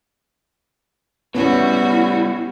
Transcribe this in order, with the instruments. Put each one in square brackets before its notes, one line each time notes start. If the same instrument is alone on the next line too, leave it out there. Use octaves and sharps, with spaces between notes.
[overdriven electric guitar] A2 G3 [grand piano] B3 C#4 [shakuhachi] E4 [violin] F#4